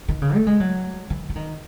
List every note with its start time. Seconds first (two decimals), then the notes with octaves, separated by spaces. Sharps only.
0.08 D#3
0.22 C#3
0.35 A3
0.47 G#3
0.60 F#3
1.10 E3
1.29 E3
1.36 D#3